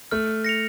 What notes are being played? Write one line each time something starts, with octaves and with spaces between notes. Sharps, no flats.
A3 F6
A#6 C#7 F7